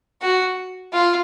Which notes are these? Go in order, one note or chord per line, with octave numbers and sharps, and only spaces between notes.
F#4
F4